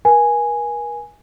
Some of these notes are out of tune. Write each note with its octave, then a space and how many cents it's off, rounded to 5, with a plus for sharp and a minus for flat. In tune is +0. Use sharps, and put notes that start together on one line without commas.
A#4 +45 G#5 +0